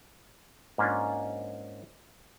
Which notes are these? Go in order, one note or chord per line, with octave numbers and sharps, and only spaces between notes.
G#2 A#3 C#4 D4 F4